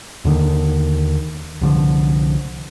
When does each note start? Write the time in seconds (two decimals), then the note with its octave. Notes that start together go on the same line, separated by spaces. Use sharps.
0.25 D#2 D3 D#3
1.61 C2 D3 F3